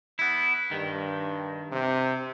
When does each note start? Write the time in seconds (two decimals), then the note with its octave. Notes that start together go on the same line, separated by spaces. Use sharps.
0.19 B3 E4
0.71 G2 D#3
1.72 C3